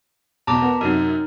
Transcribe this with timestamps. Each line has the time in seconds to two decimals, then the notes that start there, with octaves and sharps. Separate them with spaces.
0.47 B1 E2 B2 A5 A#5 D6
0.62 B3 A#4
0.81 F#2 C3 F#3 D#4 A#4